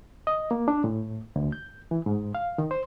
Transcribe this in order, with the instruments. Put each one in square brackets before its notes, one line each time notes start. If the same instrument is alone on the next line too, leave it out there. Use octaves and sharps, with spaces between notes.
[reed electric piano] D#5
A#3
D4
A2
D2
G6
E3
G#2
F5
D#3
C5